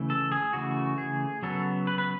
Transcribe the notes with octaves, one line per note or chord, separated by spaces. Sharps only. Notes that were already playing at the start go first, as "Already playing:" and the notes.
Already playing: C#3 E3 A3
A4
G#4
C#3 E3 A3 F#4
G#4
C#3 F#3 B3 A4
B4
B4